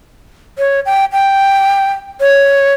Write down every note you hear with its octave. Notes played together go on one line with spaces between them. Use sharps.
C#5
G5
G5
C#5